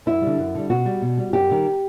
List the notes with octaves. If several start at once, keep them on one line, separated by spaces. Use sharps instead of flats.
F#2 E4
D3 G3
F#2
D3 G3
B2 F#4
G3
B2
G3
F#2 G4
D#3 G3